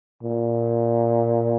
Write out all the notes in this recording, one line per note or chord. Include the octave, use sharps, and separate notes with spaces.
A#2